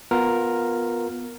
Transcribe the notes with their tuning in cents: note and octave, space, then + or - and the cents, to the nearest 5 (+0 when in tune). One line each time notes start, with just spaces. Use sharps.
B3 +0 F4 +20 A#4 +0